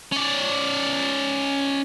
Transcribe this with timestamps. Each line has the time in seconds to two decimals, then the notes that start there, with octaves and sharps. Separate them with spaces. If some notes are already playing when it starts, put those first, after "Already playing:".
0.12 C#4 D5